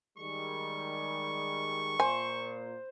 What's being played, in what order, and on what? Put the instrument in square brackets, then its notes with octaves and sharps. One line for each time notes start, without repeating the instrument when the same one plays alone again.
[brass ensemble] D#3 G3 G#3 [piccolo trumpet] C#6
[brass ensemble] A#2 [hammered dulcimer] C5 [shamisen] G#5